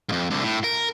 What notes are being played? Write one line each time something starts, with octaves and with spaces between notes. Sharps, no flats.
F2 G#2
C2 D3
A2
A#4